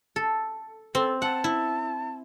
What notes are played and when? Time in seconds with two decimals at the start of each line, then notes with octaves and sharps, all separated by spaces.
0.16 A4
0.95 C4 A4
1.22 F#5 A5
1.44 E4